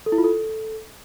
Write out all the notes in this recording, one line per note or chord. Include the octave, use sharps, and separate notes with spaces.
A4
E4
F4
A4